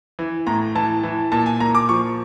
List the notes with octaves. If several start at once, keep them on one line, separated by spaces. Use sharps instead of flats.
E3
A2 A#5
E3 A5
E3
A#2 A5
G#5
A#2 A#5
D6
F3 C#6